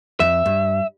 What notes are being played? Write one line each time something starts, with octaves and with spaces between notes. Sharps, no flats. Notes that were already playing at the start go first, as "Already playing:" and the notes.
F2 E5
G2